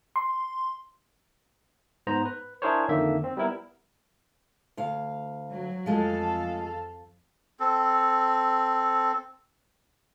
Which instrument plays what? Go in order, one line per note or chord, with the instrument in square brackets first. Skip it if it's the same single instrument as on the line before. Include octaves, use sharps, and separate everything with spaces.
[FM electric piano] C6
[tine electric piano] G#2 B3 C5 A#5
B4
D4 E4 G#4 A#4 C5 C#5
F2 D3 D#3 A#3 E5
C4
G3 B3 E4 A#4
[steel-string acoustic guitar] D2 F5
[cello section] F#3
[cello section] F2 A4 F5 [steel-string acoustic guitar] F3 G#3 A3
[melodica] C4 A4